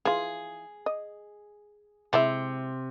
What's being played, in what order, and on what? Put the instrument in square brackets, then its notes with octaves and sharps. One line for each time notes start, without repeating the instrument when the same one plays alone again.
[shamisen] E3 F4 [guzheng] G#4
[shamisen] D#5
[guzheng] C3 [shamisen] G#3 E4 E5